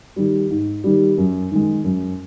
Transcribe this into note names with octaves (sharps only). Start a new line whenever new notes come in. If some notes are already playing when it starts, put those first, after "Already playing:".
D#3 G3
G#2
D#3 G3
F#2
D#3 G#3
F#2